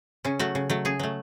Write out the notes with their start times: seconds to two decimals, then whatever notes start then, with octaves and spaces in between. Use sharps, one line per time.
0.25 C#3 C#4
0.39 F#3 A3 F#4
0.55 C#3
0.70 F#3 A3
0.85 C#3 G#4
0.99 F#3 A3